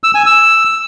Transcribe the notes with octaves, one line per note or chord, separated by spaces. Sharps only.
E6
G#5
E6